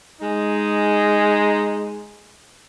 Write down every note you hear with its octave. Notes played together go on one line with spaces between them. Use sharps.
G#3 D#4